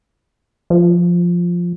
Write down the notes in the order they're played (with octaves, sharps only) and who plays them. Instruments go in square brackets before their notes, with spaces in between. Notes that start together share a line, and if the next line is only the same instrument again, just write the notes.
[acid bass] F3